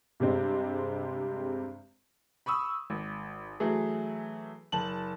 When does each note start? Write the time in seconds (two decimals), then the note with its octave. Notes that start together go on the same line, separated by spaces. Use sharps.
0.20 G2 C3 G#3 C4
2.46 B5 C#6 D#6 E6
2.90 G#1
3.60 E3 F#3 A3 G#4
4.72 F#1 A5 F#7